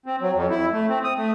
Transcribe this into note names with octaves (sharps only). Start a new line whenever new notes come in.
C4
F#3
F2
E4
A3
C4
D#6
A3